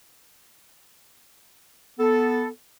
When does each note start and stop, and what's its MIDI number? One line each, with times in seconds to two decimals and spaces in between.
1.99 2.47 59
1.99 2.47 69